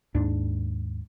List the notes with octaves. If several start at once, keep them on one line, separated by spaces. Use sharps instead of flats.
D#2 G#2 D4